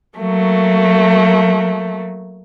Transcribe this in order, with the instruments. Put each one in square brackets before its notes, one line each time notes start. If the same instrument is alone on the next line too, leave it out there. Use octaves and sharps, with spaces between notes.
[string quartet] F#3 A3 A#3